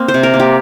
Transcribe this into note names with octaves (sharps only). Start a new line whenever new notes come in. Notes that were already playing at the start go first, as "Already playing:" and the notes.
Already playing: A#3 C4
C5
C3
A#4
A#3
G4